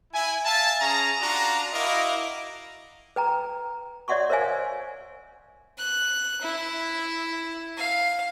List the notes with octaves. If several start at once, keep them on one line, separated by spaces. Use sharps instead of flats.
E4 G#5
E5 F5 G#5 A5
C#4 G#4 A#5
D4 F4 F#4 A#5
E4 F#4 A#4 D#5 F5 D6
B4 G5 A#5
C#5 D5 E5 F#5 C6 C#6
A#4 C5 C#5 E5 F5 G#5
F#6
E4
F5